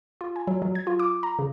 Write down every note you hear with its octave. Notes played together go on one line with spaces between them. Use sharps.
F4
G#5
F#3
F#3
G#6
F4
D6
A#5
C#3